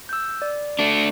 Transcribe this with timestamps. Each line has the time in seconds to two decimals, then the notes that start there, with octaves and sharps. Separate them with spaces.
0.09 E6 G6
0.42 D5
0.79 A3 D4